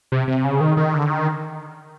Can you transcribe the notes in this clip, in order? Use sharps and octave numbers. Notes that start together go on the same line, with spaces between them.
C3
C3
C#3
D#3
D#3
D3
D#3